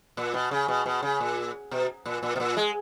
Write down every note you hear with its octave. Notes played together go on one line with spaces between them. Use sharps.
A#2
B2
C#3
B2
B2
C#3
A#2
B2
A#2
A#2
B2
A#2
G#3